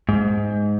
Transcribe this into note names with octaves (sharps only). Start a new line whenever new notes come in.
G#2